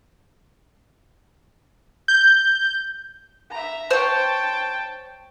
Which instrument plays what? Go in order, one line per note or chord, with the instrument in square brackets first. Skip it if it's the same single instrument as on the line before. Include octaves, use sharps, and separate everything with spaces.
[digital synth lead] G6
[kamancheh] E5 A#5
[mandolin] C5 C#5 [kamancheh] G5 A5